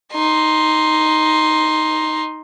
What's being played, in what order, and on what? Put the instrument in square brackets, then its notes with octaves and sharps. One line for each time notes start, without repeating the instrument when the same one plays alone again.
[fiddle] D#4 C6